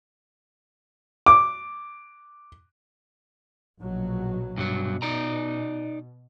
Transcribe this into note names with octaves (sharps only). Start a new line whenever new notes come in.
D6
A#1 B2 F#3
G2 B2 F#3
D#4 D5 A#5